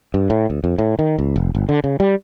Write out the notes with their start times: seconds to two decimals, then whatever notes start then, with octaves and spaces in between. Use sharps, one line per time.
0.14 G2
0.30 A2
0.50 D2
0.64 F2
0.78 A2
0.99 D#3
1.19 C#2
1.36 F1
1.55 G1
1.69 D3
1.84 C#3
2.00 G3